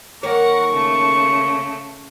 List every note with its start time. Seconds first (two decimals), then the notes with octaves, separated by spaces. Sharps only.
0.23 D#3 A#3 A#4 C#5 F#5 C#6
0.72 C#3 A3